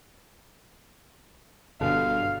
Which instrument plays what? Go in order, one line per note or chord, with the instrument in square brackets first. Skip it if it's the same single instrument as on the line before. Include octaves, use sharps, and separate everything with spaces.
[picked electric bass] G1 [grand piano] B2 D3 [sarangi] F5